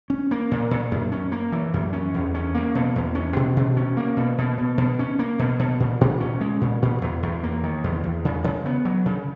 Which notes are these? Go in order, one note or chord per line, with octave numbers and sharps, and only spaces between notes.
C#4
A#3
A#2
A#2
F#2
C#4
A#3
E3
F#2
C#4
E2
C#4
A#3
B2
E2
C#4
B2
B2
C#4
A#3
B2
B2
B2
B2
C#4
A#3
B2
B2
A#2
A#2
C#4
G#3
A#2
A#2
E2
E2
A#3
D#3
E2
E2
C#3
C#3
B3
F#3
C#3